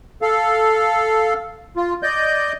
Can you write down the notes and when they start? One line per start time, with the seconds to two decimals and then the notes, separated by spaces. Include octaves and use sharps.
0.22 A4 F5
1.77 F4
2.03 D5 D#5 G6